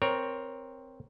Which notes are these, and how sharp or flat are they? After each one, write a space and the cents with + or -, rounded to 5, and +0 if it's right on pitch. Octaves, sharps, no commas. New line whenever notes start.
C4 +0 A#4 +20 C#5 +0